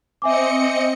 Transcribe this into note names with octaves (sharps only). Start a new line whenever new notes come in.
C4 D#5 E5 G#5 D6 C#7